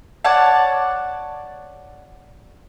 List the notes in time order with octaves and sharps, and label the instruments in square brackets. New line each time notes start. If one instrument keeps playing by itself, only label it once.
[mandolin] C#5 D5 F#5 A5